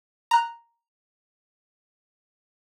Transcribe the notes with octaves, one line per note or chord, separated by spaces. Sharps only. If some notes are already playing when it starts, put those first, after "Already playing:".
A#5 F#6